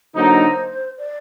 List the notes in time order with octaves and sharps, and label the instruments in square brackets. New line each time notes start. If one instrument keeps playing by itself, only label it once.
[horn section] D3 F#3 A#3 D#4 [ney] C5
[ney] D5